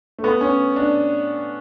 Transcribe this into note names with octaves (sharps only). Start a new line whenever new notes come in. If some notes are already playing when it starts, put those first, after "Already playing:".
A3
B3
C#4
D4